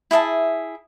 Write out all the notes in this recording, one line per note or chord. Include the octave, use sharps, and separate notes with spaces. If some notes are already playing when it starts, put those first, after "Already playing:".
E4 G#4 E5 A5